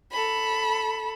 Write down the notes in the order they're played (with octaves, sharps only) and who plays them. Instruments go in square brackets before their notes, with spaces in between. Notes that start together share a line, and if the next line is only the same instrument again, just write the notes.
[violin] A4 B5